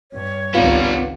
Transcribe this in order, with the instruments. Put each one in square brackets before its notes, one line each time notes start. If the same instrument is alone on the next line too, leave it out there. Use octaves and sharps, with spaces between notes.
[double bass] G2 [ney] C#5
[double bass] G#1 C#2 [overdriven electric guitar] G3 B3 [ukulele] D#4 F4